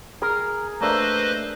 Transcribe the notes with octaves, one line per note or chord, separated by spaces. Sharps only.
G#4 A#4
A3 A#3 D4 B4 C5 D#5 E5